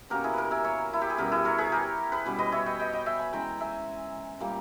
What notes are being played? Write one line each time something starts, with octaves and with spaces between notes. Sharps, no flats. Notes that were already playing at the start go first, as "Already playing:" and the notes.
B2 A#3 C#4 G4 A#4
E4 G#4
G4 A#4 B4
E5 G#5
C#5 E5
E4
G4
G#4
B2 G3 C#4 G4 A#4
E4 G#4
A#4 C#5
G#4 B4
G4 A#4
G#4 B4
B2 G3 C#4
B4 D#5
C#5 E5
D#5 G5
D#5 G5
D#5 G5
E5 G#5
G#5 B5
E3 G#3 C#4 G5 A#5
E5 G#5
A#2 G3 A#3